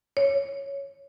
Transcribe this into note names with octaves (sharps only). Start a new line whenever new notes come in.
C#5